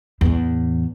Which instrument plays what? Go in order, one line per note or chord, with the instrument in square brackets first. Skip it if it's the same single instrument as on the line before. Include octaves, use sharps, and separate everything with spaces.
[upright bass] E2 A2